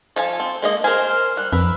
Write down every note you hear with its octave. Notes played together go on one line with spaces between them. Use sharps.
F3 A4 F5 G#5
C4
G#3 A#3 G#4 D#5
A#4 C5 G#5 F6
G3 F#6
F2 A#4 B4 E6